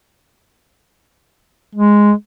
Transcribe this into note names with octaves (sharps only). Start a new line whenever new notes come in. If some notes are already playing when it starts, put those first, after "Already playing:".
G#3